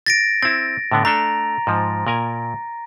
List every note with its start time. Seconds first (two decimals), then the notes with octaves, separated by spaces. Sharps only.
0.06 A6 A#6 D7
0.43 C4 E4 A6
0.91 A2 D3 B3
1.05 A3 D4 A4 A#5
1.67 G#2 F3
2.07 A#2 A#4 G#5